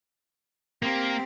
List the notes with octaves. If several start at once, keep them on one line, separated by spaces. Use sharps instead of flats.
A#3 C4 G4